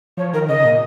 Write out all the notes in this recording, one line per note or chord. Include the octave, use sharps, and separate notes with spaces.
F3 C#5
D#3 A#4
C#3 D#5
A#2